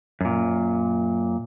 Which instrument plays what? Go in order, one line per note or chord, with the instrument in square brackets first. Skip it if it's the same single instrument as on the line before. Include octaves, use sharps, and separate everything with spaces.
[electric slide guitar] F#2 A#2